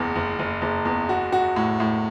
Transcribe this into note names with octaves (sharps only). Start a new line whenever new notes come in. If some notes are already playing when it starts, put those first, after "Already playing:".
Already playing: F#1 E2
F#1
F#1
F#1
E2
F#4
F#4
A2
A2